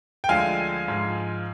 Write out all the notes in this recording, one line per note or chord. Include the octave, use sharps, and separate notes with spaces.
G5
D2 D3 F3 G#3 F5 G#5
G#2 F3 G#3